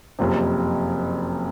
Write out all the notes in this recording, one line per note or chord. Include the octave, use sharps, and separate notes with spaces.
F#1 F2 C3